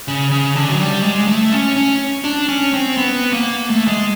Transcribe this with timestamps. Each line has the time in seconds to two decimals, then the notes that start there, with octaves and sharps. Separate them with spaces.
0.08 C#3
0.31 C#3
0.56 D3
0.69 F#3
0.80 G3
1.04 G#3
1.27 A3
1.52 C#4
1.76 C#4
2.24 D4
2.49 C#4
2.73 C4
2.97 B3
3.33 A#3
3.70 A3
3.87 G#3